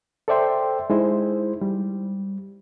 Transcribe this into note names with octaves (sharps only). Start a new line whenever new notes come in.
A4 C5 D5 E5 G5 C6
G#3 D#4 E4 C5
G3